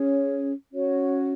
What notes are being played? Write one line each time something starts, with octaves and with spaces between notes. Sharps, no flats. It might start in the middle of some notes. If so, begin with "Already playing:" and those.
Already playing: C#4 G#4 C#5
C#4 F#4 C#5